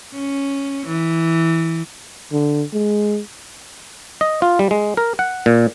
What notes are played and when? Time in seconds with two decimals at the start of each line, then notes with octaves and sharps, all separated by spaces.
0.14 C#4
0.87 E3
2.32 D3
2.73 G#3
4.21 D#5
4.42 F4
4.59 G3
4.71 G#3
4.97 A#4
5.19 F#5
5.46 A#2